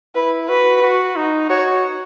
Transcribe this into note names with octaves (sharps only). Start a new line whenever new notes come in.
E4 B4
F#4 B4
F#4
D#4
F#4 C#5